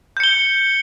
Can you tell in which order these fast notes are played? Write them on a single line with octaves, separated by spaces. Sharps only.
G6 C#7 G7